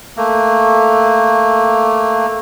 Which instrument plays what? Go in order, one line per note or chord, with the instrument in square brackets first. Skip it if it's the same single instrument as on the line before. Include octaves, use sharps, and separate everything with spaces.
[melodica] A3 A#3